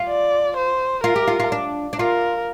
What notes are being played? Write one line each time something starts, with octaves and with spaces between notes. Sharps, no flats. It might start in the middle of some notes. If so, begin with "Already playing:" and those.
Already playing: F4
D5
C5
F4 A#4
G4
F4
F4
D4
D4
F4 A#4